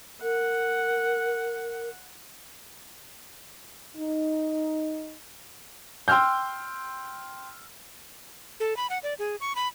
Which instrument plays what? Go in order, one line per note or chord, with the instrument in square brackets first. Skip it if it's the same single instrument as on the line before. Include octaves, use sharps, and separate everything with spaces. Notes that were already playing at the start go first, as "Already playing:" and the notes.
[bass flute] A#4 [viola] F#5
[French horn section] D#4
[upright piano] G5 C6 E6 F6 G6
[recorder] A4
B5
F#5
D5
G#4
C#6
B5